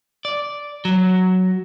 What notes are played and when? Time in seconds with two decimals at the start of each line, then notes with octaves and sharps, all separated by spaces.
0.25 D5
0.85 F#3